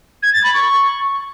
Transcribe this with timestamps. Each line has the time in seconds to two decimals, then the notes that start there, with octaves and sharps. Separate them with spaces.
0.23 G#6
0.33 A6
0.44 B5
0.54 C#6